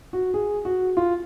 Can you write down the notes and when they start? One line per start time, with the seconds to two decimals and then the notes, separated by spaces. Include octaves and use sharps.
0.13 F#4
0.34 G#4
0.65 F#4
0.97 F4